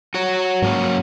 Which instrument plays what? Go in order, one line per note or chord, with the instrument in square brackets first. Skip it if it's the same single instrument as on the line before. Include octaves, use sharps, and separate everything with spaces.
[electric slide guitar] F#4 C#5
[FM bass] G#2 [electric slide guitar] F#3 A#3 C#4